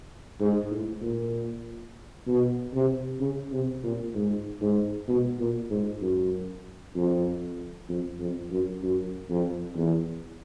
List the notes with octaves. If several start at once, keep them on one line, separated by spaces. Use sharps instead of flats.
G#2
A2
A#2
B2
C3
C#3
C3
A#2
G#2
G#2
B2
A#2
G#2
F#2
F2
F2
F2
F#2
F#2
F2
E2